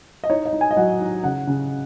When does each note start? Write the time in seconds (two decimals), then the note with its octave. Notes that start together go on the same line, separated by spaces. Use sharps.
0.24 D#5
0.30 D#4 C#5
0.45 D#5
0.53 D#4
0.61 G#5
0.71 D#5
0.77 F#3 F#5
1.00 D#4
1.24 C#3 F#5
1.47 C#3